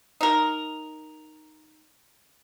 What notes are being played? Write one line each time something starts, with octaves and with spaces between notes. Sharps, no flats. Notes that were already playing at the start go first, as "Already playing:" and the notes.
D#4 A#4